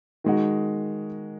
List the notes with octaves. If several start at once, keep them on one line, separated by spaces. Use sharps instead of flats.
D#3 G#3 D#4 F#4